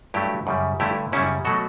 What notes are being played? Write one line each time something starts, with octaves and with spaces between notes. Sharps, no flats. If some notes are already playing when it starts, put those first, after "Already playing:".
G2 F#3 A3 E4 G4
F#2 C#3 G3
G2 D3 A3 E4 G4
F#2 C#3 G3 C#4 E4
B2 F#3 A3 F#4 A4